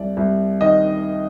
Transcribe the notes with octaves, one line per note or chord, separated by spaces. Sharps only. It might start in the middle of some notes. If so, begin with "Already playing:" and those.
Already playing: C2 D5
C2
D#3 D#5